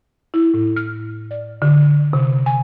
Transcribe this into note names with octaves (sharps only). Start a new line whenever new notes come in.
E4
A2
F6
D5
D3
C3
G#5